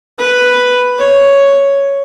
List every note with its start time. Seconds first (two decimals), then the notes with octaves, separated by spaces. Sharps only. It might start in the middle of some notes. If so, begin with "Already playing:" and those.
0.19 B4
0.99 C#5